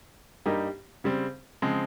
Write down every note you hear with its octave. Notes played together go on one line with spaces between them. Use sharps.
G2 G3 A#3 D#4 G4
C#3 G3 C4
C#3 F3 G#3 C4